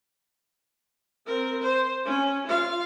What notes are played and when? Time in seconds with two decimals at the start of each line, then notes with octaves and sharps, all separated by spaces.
1.27 C4 A#4
1.62 C5
2.06 C#4
2.47 F4 F5